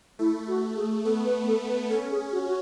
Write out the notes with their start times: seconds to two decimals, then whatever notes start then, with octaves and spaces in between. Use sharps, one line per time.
0.19 A3 E4
0.48 F#4
0.76 G#4
1.04 B3 A4
1.26 B4
1.47 A4
1.69 B4
1.90 C#4 A4
2.11 G#4
2.32 F#4
2.46 F#4